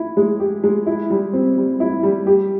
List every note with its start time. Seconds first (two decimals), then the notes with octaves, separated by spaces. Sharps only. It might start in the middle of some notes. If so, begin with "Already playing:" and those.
Already playing: E4
0.17 G#3
0.40 G4
0.64 G#3
0.86 E4
1.10 G3
1.33 C4
1.57 G3
1.80 E4
2.03 G3
2.27 G4